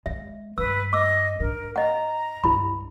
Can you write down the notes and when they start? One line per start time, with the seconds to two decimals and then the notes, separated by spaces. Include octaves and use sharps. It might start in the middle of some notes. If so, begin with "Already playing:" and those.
0.06 G#3 E5
0.58 G2 B4 E6
0.93 D#5 D6 E6
1.40 G#2 D4 A#4
1.76 D#5 F#5 A#5
2.44 C#2 G2 E4 B5